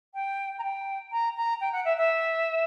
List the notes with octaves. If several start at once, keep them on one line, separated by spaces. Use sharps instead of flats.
G5
A#5
G5
A#5
A#5
G5
F#5
E5
E5